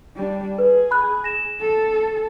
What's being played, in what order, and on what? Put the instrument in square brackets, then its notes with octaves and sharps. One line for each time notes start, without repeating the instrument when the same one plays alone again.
[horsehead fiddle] G3 D4
[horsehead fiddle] G#4 [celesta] B4
[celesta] B5 F#6
A#6 E7
[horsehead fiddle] A4